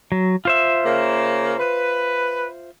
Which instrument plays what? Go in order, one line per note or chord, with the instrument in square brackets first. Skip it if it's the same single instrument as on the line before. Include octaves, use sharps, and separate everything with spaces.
[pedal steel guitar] F#3
F4 C5 E5
[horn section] C#3 A#3
B4